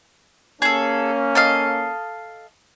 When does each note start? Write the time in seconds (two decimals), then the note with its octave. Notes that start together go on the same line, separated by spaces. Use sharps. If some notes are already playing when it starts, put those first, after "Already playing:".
0.62 A#3 C#4 G#4 A4
1.35 A4 D#5 F5